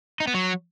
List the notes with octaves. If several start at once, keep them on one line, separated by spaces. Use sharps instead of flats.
D#4
B3
F#3